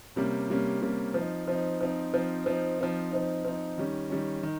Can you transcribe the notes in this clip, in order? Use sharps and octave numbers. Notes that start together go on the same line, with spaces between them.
C3 G3 A#3 C#4
C3 G3 A#3 C#4
C3 G3 A#3 C#4
F3 C4 D#4
F3 C4 D#4
F3 C4 D#4
F3 C4 D#4
F3 C4 D#4
F3 C4 D#4
F3 C4 D#4
F3 C4 D#4
D#3 G3 C#4
D#3 G3 C#4
D#3